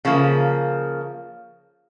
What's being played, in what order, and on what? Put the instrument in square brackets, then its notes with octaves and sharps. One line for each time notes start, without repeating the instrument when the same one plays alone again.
[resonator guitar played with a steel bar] C#3 F3 A#3